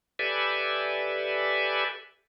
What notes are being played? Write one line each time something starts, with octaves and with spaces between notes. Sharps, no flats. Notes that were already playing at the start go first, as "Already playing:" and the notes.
G4 A4 B4 D5 E5 G#5